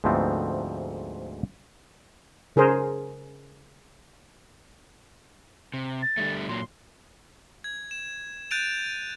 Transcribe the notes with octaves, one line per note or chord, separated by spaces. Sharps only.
D2 G#2 F3 A3 B3 C4
C#3 G#4 A#4 C5
C3
A6
D3 G3 A3
A#2 F#3 C6
G#6
E7
F#6 G6 A6 D7 D#7 F7